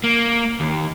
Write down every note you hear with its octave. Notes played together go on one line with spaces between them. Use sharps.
A#3
D#2